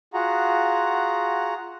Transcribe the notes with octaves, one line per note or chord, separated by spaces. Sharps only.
F4 F#4 G#4 F#5 A#5